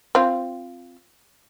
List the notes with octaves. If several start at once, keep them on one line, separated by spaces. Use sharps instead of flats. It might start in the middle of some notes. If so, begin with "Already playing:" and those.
C4 F4